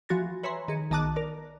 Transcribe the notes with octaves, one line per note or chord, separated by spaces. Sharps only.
E3 F3 F#4 G#5 A6 A#6
B4 C#5 E5 G#5 A#5 C6
D#3 G#4 C#7
B1 D#3 D#5 A5 D6 F#6
A#4 D5